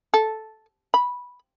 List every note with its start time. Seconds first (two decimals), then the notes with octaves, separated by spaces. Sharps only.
0.14 A4
0.94 B5